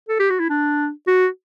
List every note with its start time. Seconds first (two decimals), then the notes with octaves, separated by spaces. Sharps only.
0.09 A4
0.20 G4
0.30 F#4
0.40 E4
0.50 D4
1.08 F#4